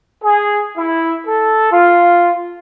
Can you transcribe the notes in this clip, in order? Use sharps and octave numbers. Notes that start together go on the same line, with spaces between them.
G#4
E4
A4
F4